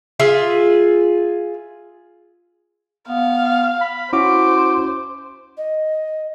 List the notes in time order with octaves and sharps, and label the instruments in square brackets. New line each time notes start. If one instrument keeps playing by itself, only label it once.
[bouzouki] F4 G#4 E5
[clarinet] B3 [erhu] F5
[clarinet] B5
[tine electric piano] C#4 E4 F#4 [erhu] C5 [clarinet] D6
[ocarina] D#5